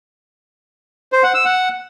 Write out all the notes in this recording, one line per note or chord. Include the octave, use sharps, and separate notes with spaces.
C5
F#5
E6
F#5